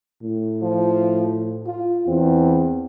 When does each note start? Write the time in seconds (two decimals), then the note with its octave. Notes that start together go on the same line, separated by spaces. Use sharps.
0.23 A2
0.63 F3
1.66 F4
2.08 E2 C4